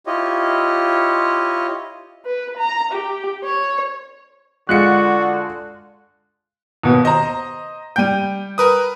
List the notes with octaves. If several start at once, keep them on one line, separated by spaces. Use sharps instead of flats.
E4 F4 G4 C#5 D#5
B4
A#5
G4
C#5
D3 G#3 F4 F#4 F#6 C#7
D#2 B2
C5 D#5 A#5
G3 G5 G6 D#7
A#4 B4 D#6